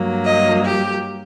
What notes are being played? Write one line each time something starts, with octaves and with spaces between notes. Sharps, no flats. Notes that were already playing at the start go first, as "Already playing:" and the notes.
Already playing: G2 F#3 A#3
D#5
G4